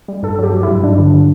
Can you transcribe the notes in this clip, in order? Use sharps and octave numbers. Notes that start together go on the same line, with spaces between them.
G3
G2 A4
F#3 G4
F#3
E4
G2
G2 D4
D3